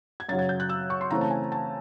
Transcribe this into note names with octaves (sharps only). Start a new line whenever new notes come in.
G#6
F#2 C#3 F#3 A6
G#6
G6
F#6
E6
C#6
C6
C#3 E3 A3 C4 A#5
A5
G#5
A5